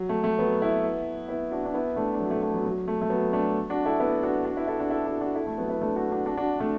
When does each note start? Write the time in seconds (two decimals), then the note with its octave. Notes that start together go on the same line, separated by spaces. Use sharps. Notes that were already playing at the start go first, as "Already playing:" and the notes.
Already playing: F#3
0.09 A3
0.24 A3
0.39 F#3 B3
0.62 B3 E4
1.29 B3 E4
1.51 D4 F#4
1.65 D4
1.74 B3 E4
1.96 A3 D4
2.14 D4
2.20 F#3 B3
2.31 A3
2.42 A3
2.53 F#3 B3
2.65 F#3
2.88 A3
3.02 A3
3.10 F#3 B3
3.33 A3 D4
3.70 D4 F#4
3.85 E4 A4
4.00 B3 E4
4.23 D4 F#4
4.45 D4 F#4
4.57 B3 E4
4.67 E4 A4
4.79 D4 F#4
4.90 E4 A4
5.06 D4 F#4
5.21 D4 F#4
5.35 E4 A4
5.47 A3
5.58 F#3 B3
5.69 B3 E4
5.81 A3 D4
5.96 D4 F#4
6.11 D4 F#4
6.26 D4 F#4
6.37 D4 F#4
6.60 A3 D4